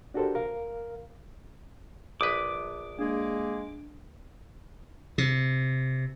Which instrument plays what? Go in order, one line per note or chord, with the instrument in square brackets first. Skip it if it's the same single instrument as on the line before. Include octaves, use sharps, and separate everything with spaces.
[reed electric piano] D4 F#4 G4 A4 A#4 C5
A#4 F5
[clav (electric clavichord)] A#1 B4 [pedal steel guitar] D6 [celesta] D#6
[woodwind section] G#3 A#3 G#4 [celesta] D4
[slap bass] C3